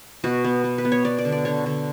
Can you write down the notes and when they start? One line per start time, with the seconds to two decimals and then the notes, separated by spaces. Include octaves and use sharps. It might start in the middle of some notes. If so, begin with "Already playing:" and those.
0.24 B2 F#4
0.44 B3
0.64 B3
0.78 B4
0.85 B3
0.92 C#5
1.05 B3 D5
1.19 D5
1.25 D3
1.32 D5
1.45 D3 C#5
1.66 D3